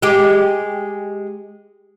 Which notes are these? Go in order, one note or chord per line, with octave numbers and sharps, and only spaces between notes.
G#3 G4